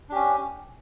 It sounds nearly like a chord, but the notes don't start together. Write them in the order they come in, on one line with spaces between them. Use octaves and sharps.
D4 G4 C#4